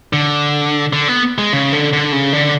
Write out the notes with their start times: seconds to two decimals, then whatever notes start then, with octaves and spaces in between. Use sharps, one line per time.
0.13 D3
0.93 D3
1.08 B3
1.38 G#3
1.53 C#3
1.73 D3
1.93 D3
2.12 C#3
2.33 D3